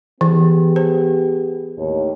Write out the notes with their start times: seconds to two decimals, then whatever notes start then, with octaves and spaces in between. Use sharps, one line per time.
0.21 E3 B3 G4 G#4
0.76 C5
1.78 D#2 A2 C#5